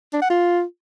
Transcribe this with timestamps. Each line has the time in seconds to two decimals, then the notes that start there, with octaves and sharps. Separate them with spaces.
0.13 D4
0.22 F#5
0.30 F4